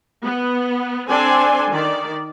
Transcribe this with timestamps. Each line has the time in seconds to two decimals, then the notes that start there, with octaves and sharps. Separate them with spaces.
0.24 B3
1.09 C4 D4 A4 D5 G#5 C6
1.70 D#3 D5